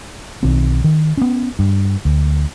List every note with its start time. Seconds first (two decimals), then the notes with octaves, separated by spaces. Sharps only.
0.43 B1 D#3 C4
0.84 D#3
1.17 B3 C#4
1.59 G2
2.05 D2